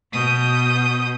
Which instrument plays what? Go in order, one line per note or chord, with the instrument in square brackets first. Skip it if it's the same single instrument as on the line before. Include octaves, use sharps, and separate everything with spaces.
[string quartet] B2 D#6 G6